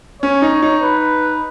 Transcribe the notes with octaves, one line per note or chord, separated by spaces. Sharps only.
C#4 C#5
D#4
D#4
B4